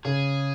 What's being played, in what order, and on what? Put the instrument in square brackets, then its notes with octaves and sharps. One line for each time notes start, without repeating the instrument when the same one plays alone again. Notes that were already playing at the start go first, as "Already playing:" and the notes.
[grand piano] C#3 [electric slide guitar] G#4